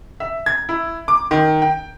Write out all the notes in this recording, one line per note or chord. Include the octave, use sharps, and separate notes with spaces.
E5
G#6
E4
D6
D#3
G5